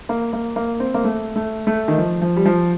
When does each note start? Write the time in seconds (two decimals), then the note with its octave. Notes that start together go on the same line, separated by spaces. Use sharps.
0.09 A#3
0.33 A#3
0.56 A#3
0.80 C4
0.94 A#3
1.04 A3
1.36 A3
1.67 A3
1.88 D#3
1.98 F3
2.22 F3
2.36 G3
2.46 F3